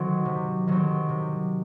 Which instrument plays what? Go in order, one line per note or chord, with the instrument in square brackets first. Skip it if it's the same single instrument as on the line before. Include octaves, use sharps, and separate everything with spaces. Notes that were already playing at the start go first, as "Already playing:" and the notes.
Already playing: [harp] D#3 F#3 C4
C3
D#3 F#3 C4
C3